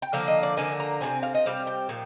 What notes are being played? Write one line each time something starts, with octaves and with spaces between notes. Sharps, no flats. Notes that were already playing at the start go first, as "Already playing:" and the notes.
G5
D3 F3 A#3 F5
D#5
D5
D3 F3 A#3 G#5
A#5
C3 G3 C4 G#5
F5
D#5
C3 G3 C4 F5
G5
A#2 F3